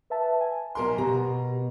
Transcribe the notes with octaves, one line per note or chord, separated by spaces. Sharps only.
B4 E5 A5
G#5
B1 A#4 C6
B2 G4 A#5